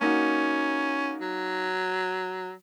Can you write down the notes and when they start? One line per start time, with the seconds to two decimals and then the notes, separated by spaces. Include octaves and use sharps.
0.01 A#3 C#4 D#4 F#4
1.21 F#3